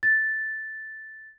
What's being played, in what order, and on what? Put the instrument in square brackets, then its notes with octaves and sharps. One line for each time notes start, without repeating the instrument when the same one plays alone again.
[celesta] A6